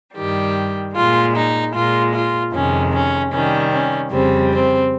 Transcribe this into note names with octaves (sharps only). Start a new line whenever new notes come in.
G2 D#3 G3 G4
A#2 G#3 F4
D#4
A#2 G#3 F4
F4
F2 C3 D#3 G#3 C#4
C#4
C3 D#3 G3 C#4
C#4
F2 C#3 G3 C4
C4